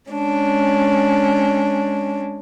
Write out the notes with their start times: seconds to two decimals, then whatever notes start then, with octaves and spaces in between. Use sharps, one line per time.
0.11 G#3 C#4 D4